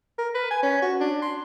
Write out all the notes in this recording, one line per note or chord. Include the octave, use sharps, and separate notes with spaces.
A#4
B4
G#5
C#4
F#4
D4
C6